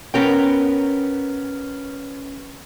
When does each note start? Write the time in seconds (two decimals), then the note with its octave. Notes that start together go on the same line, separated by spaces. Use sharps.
0.14 B3 C#4 A#4 G5